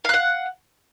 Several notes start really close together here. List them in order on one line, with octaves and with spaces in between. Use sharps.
F5 F#6 F#5